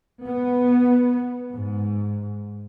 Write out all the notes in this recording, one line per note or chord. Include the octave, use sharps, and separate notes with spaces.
B3
G#2